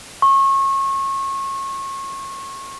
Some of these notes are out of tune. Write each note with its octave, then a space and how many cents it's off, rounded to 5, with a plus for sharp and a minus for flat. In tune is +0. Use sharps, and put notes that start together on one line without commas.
C#6 -30